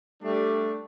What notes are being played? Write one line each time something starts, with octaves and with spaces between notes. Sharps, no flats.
G3 A3 D4